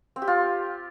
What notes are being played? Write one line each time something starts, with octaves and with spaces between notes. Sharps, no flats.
C4
G4
F4